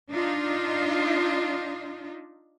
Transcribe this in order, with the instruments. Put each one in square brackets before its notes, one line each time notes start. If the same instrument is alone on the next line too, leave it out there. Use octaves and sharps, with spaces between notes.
[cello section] D4 D#4 F4